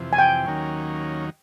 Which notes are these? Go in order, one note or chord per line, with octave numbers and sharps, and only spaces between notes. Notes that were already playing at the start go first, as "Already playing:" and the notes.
Already playing: F2 C3 E3
G#5
G5
D#2 D#3 F#3 A#3 C#4